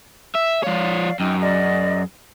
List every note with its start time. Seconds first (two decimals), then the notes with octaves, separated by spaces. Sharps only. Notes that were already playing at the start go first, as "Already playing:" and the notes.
0.35 E5
0.64 F3 C#5 D5 F5
1.20 F#2 D#4 G5
1.41 G#4 D5 D#5